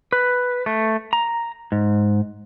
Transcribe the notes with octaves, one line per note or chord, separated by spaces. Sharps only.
B4
A3
A#5
G#2